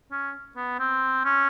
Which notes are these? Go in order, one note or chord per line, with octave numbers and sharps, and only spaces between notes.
C#4
B3
C4
C#4